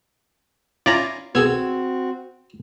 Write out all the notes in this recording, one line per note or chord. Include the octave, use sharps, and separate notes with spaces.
C#4 E4 F4 D5 A#5
B3 C4 F#4 G#4 A4 E6 G#6